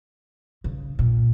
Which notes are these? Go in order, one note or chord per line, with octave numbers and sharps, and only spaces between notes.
C#3
A#2